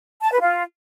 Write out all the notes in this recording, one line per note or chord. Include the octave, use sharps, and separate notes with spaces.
A5
B4
F4